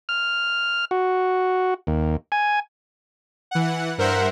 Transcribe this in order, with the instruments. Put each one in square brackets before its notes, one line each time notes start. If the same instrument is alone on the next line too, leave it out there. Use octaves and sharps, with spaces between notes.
[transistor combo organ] F6
F#4
D#2
G#5
[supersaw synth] E3 F#5
G2 A#4 C5 E5 F#5